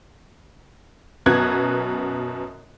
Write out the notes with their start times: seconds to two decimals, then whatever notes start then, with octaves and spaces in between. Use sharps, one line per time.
1.26 F#2 B2 B3 F#6 G#6